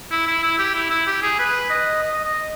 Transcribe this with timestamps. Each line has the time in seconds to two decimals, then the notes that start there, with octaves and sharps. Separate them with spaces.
0.11 E4
0.27 E4
0.43 E4
0.59 G4
0.75 E4
0.90 E4
1.07 G4
1.22 G#4
1.39 B4
1.70 D#5
2.02 D#5
2.24 D#5